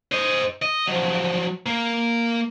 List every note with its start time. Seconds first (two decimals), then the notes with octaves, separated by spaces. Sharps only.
0.12 C5 D#5
0.62 D#5
0.87 F3 F#3
1.66 A#3